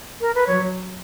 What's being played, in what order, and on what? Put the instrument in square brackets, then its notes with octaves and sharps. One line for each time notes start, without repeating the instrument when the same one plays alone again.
[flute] A#4
B4
[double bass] F#3 [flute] C#5